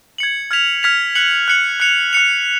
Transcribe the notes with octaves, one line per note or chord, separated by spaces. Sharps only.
G#6 C#7 F#7
F6 G#6 B6 F7
F6 G#6 B6 F7
F#6 C#7 F#7
F#6 C#7 F#7
F#6 C#7 F7
F#6 C#7 F7